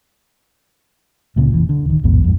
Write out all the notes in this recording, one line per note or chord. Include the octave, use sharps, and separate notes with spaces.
C#2 A#2 C#3
F1 B2 E3
D3
D1 D#3
A#1 E2 G#2 B3
F2 G#2